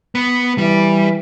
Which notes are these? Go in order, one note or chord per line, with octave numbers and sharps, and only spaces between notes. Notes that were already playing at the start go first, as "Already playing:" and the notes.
B3
E3 G3